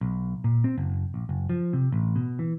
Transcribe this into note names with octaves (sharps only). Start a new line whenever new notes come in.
B1
A#2
C4
F#1
A#1
F#1
F3
C3
A1
B2
E3